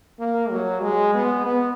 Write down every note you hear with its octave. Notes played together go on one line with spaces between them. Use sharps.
A#3
F#3
G#3
B3
B3